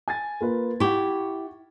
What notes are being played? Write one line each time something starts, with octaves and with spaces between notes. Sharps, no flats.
G#5 G#6 A6
A#3 F4 B4
E4 G4 F#5 C#6